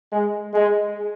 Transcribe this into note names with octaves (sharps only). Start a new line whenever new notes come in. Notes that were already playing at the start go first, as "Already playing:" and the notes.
G#3
G#3